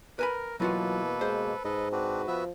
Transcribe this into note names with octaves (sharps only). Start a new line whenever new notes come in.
A#4 B4 G#5 B5
B2 E3 F#3 A#3 F4 F#4 A4 B4
G#3 C5
G#2 A4 B4 D#5
C4 D4 F#4 B4
F3 B3 E5